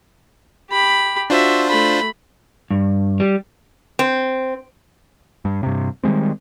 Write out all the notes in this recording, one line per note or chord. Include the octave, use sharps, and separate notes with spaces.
G4 B5
D4 F4 F#4 C5 E5
A3 B5
G2
G3
C4
G2
G2 C3
D#3 G3 G#3 C4